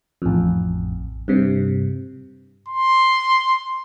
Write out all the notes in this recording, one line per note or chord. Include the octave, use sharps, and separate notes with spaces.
A1 F2
G2 C3
C6